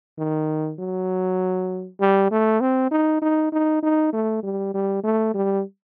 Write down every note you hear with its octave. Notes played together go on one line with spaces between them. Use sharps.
D#3
F#3
G3
A3
C4
D#4
D#4
D#4
D#4
A3
G3
G3
A3
G3